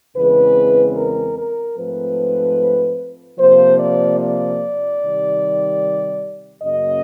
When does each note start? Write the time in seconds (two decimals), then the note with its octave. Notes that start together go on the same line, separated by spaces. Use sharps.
0.16 E2 C#3 E3 G#3 C4 B4
0.96 A#4
1.37 A#4
1.77 G#2 F3 A3 C4 B4
3.39 C3 F3 A#3 C5
3.79 D5
4.20 D5
5.00 C3 D#3 G3
6.62 F#2 C#3 F#3 A#3 D#5